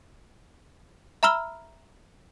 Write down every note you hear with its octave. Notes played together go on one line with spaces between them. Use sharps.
E5 A#5 B5 E6 F6 G7